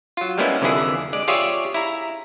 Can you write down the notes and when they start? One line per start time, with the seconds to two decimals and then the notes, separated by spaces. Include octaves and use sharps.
0.17 F#3 F4
0.38 G3 G#3 A#3 B3 C#4 E4
0.61 C2 F2 D3 E3 E4 G#4
1.13 G#3 D5
1.28 F4 G4 G#4 C#5 D5 E5
1.74 E4 A#5